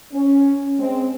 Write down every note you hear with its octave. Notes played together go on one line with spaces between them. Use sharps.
C#4
G#3 C4